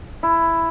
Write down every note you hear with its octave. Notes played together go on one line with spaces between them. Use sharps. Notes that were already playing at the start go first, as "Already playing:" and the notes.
E4